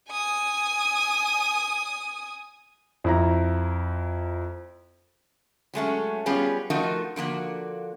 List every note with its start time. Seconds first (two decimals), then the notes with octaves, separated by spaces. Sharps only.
0.10 G#5 D#6
3.04 F2 E4 A#5
5.74 F#3 G#3 A3 C#4
6.26 G3 B3 C#4 F4 G#4
6.70 F3 A3 D#4 F4 F#4 A#4
7.16 D3 F3 A#3 F#4